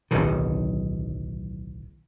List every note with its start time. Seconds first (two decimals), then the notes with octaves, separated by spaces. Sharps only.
0.11 D1 B1 D#3